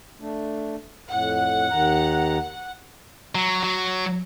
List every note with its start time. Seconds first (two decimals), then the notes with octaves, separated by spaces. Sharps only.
0.21 A3 D4
1.09 F2 A2 F#5
1.71 D#2 D#3 A#5
3.35 F#3
3.63 F#3